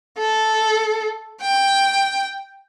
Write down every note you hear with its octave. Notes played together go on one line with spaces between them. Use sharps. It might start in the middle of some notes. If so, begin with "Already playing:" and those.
A4
G5